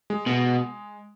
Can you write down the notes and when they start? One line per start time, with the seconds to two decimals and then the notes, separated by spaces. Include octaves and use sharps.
0.10 G#3
0.26 B2